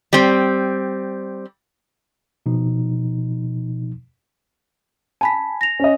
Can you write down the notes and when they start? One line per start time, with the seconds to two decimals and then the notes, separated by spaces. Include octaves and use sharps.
0.13 G3 C4
2.46 B2 F3 D#4
5.21 G#5 A5 B5 B6
5.61 A#6 F7
5.80 C#4 D#5